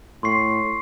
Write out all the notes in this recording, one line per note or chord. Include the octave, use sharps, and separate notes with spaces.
A2 C6 C#6 C7